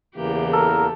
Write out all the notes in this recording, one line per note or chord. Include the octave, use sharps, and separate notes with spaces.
E2 C#3 E3 A#3 G4
A4 A#4